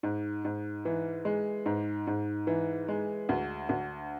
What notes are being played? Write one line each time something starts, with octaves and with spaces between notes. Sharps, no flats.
G#2
G#2
E3
G#3
G#2
G#2
E3
G#3
D2
D2